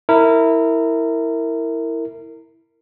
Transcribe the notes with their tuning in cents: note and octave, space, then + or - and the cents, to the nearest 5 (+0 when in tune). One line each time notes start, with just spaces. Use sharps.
E4 -10 A#4 -25